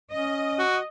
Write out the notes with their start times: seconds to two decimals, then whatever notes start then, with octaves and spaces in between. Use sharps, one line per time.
0.13 C#4 D#5
0.59 F#4